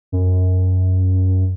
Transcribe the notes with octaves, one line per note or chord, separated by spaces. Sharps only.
F#2